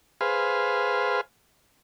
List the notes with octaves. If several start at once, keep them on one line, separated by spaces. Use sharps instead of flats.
G#4 B4 C5 F5